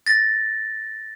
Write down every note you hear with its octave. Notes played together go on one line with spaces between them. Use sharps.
A6 A#6